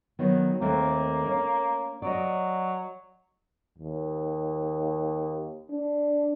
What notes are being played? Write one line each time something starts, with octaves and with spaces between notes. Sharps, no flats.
D#3 F#3 B3
D#2 A3 A#3 C4
C#4
F#3 D5 D#5
D#2
D4